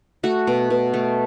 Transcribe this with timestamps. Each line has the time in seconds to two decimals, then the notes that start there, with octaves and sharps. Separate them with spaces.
0.23 A3 F#4
0.47 B2
0.70 B2
0.94 A3